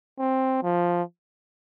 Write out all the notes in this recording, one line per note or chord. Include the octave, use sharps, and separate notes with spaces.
C4
F3